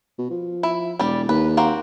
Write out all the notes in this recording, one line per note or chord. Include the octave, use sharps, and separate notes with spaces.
B2
F3
E4
E1 G3 D5
D#2 B4
A#3 C4 F#4